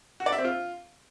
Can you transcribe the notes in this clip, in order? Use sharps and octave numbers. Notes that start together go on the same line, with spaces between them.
F#4
D5
E5
C4
F4